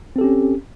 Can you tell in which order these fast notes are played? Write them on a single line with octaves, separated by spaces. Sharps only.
C4 A4 G4 C#4